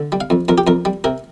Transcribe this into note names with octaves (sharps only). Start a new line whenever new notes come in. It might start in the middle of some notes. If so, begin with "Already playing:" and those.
Already playing: D3
G3
F5
F2
F2 A#4
G4
F2 A#4
G3
C3 A#4